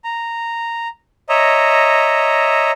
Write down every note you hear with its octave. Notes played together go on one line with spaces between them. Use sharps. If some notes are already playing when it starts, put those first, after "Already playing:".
A#5
C#5 D#5 E5 A#5